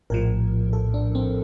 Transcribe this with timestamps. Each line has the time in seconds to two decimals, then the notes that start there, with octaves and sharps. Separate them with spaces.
0.10 A#1 A2 F3 A#4
0.73 A4
0.94 D4
1.15 C4